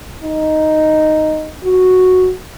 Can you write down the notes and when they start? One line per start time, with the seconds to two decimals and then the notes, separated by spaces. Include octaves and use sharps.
0.23 D#4
1.64 F#4